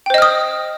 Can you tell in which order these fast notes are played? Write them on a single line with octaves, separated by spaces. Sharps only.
G5 C5 D#5 F6 D#6